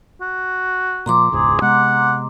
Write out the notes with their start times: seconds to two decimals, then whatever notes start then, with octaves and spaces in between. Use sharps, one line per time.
0.21 F#4
1.06 A#2 F3 A#5 C6 D6
1.32 E1 C#2 G#2 G#4
1.62 C3 G#3 B3 F#5